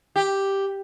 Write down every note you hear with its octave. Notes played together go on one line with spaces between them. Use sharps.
G4